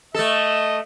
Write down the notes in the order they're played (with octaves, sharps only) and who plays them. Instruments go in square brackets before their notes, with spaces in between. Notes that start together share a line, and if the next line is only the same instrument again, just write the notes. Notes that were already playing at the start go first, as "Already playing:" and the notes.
[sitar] A3 A4 [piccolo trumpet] D#5